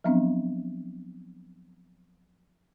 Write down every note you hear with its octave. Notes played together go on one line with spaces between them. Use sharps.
F3 F#3 B3 C4 D4